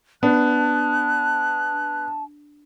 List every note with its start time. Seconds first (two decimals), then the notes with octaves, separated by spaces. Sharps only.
0.23 B3 D4 A5 F#6